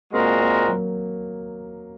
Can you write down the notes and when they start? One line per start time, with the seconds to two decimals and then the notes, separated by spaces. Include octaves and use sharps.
0.13 A#2 G#3 A#3 C4 F#4 A#4
0.40 A#3
0.68 F#3